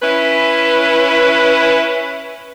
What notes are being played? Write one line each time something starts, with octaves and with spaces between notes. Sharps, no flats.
C#4 E4 B4